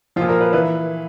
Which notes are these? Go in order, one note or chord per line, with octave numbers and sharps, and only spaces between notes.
A#2 F3 F4
A#4
B4
E3 B4